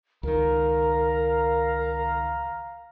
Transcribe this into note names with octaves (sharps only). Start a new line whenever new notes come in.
C#2 D#3 A#4 F5 A#5